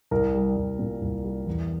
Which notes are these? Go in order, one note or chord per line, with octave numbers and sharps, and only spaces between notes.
C2 A#4
G3
C2
A#2
C2
G3
E2